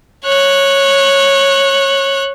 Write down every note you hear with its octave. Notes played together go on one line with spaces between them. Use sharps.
C#5 F#6